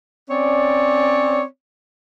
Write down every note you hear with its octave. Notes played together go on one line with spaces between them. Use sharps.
C4 C#4 C#5 D5